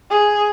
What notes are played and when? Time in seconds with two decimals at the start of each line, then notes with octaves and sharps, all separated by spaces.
0.10 G#4